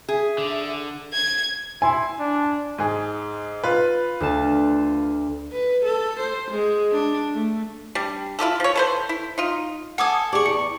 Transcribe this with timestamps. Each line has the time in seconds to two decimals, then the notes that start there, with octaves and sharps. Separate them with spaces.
0.09 G#4 E5
0.38 D3
1.13 G#6
1.82 E4 G#5 C6
2.19 D4
2.78 G#2 G#4
3.64 F4 B4
4.20 D2 A5
5.53 B4
5.85 A4
6.20 C5
6.51 G#3
6.92 D4
7.34 A3
7.95 G3 D4
8.39 E4 F4 G4 A4
8.60 F3 C#5
8.76 A4 B4 C5
9.09 E4
9.38 D#4 F4
9.98 A4 F#5 G#5 D6 D#6
10.33 G4 G#4 D5 C#6
10.46 E2 C#7